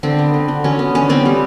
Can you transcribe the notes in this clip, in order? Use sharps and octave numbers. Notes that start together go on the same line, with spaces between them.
D3 C4
B3
D3
D3
F#3 C#4
B3
D3 C#4
B3 C4
G3